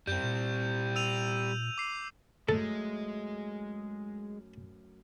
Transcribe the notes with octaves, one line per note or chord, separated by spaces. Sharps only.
F#2 G3 C4 G6
A#2
E6 D#7 F7
D6 C7
F#2 G#3 A3 A4 E6